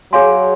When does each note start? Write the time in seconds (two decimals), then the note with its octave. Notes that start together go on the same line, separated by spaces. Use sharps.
0.12 F#3 G#4 C#5 F5 G#5 C6